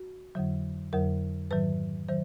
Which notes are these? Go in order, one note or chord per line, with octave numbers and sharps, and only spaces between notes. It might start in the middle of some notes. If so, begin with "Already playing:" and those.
Already playing: F#4
F2 D3 F#3
F2 D3 F#3 A#4
G#2 D#3 F#3 B4
D#3 F#3 C5